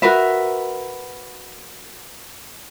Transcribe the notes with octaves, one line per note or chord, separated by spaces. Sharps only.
F#4 A#4 B4 E5